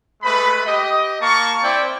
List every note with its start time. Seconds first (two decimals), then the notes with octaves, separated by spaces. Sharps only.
0.22 G#3 A3 B4 B5
0.66 G4 D#5
1.21 A#3 F5 A5 C#6
1.63 C4 E4 C5 D5 G5